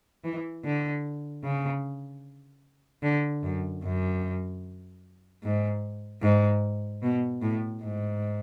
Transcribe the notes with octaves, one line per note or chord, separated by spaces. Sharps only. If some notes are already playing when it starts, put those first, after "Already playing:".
E3
D3
C#3
D3
F#2
F#2
G#2
G#2
B2
A2
G#2